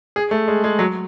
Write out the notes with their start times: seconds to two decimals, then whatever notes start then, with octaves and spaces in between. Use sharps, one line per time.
0.16 G#4
0.31 A3
0.48 G#3
0.64 G#3
0.79 F#3